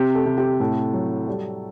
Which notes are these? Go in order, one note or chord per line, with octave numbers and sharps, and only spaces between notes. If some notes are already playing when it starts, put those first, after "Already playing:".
Already playing: C3 G4
A4
C3
G4
A2 A4
F#3
G3